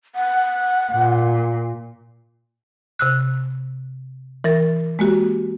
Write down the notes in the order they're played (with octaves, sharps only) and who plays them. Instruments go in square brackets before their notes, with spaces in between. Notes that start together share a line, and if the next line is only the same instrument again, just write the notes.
[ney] F#5
[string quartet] A#2
[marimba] C3 E6 F#6
E3 A#4 A6
G#3 A#3 F#4 G4